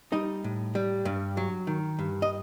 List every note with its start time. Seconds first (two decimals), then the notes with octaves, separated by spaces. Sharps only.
0.12 G3 D#4 D#5
0.44 A2
0.75 G3
1.05 G2
1.37 F#3
1.67 D#3
1.99 G2
2.22 D#5